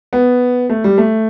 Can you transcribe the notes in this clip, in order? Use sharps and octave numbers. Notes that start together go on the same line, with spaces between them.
B3
A3
G3
A3